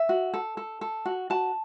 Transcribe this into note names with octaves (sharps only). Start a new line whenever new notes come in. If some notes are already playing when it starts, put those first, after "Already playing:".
Already playing: E5
F#4
A4
A4
A4
F#4
F#4 A5